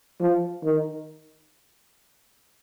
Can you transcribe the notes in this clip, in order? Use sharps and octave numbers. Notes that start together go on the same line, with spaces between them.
F3
D#3